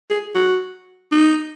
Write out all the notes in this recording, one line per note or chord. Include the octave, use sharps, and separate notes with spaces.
G#4
F#4
D#4